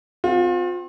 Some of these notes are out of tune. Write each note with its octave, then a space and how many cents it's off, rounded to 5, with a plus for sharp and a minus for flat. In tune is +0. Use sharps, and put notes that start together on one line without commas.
C4 -25 F4 +35